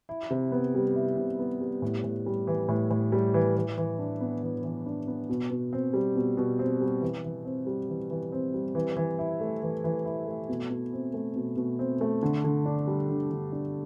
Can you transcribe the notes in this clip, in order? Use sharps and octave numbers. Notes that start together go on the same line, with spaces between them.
E4
C3
B3
G3
E4
C3
B3
G3
A2
A2
G3
E3
A2
A2
G3
E3
E3
E3
D4
B3
E3
E3
D4
B3
B2
B2
C4
G3
B2
B2
C4
G3
E3
E3
C4
G3
E3
E3
C4
G3
E3
E3
E4
A3
E3
E3
E4
A3
B2
B2
C4
A3
B2
B2
C4
A3
D3
D3
D4
G3
D3
D3
D4